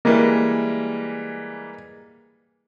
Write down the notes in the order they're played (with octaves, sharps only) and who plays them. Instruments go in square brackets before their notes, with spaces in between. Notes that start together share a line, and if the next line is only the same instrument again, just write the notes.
[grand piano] E3 G3 G#3 [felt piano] A#3